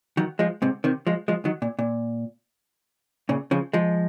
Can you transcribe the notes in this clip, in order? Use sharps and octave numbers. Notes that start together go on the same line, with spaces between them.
D#3 F#3
F3 G#3
G#2 C3
C3 D#3
F3 G#3
F3 G#3
D#3 F#3
A#2
A#2
A#2 C#3
C#3 F3
F3 G#3